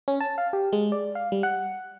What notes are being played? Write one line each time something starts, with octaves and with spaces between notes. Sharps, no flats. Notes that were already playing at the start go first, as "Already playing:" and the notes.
C#4
A5
F5
G4
G#3
D5
F5
G3
F#5